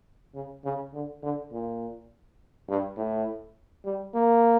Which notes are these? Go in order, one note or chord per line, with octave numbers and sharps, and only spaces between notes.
C#3
C#3
D3
D3
A#2
G2
A2
G3
A#3